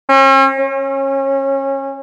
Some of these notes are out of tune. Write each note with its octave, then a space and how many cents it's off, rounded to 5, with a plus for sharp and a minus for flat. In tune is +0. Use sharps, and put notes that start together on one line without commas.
C#4 -45
C#4 -25